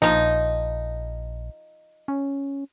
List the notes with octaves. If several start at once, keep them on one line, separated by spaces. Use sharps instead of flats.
A#1 F3 D#4
C#4